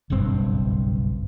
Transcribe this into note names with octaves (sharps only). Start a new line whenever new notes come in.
F#1 B1 G2 C4